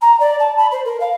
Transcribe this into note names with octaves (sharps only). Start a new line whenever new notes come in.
A#5
D5
A5
B5
C5
A#4
F5